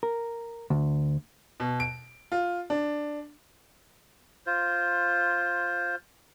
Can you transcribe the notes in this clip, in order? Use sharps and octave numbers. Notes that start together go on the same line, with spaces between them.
A#4
D2
B2
D7
F4
D4
F4 C5